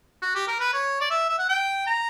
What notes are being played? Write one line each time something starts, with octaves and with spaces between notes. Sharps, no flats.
F#4
G4
A#4
B4
C#5
D5
E5
E5
F#5
G5
A#5